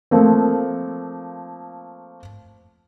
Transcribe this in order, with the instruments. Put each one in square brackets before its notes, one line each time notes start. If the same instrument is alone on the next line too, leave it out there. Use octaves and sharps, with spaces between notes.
[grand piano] F3 A3 A#3 C4